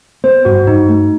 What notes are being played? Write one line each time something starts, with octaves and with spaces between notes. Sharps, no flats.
B3 C5
G2 F#4
G2 D#4
A3